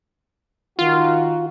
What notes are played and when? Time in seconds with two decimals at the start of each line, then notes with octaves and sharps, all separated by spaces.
0.79 D#3 F4 F#4